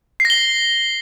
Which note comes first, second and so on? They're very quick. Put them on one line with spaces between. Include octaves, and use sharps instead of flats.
C7 A#6 G7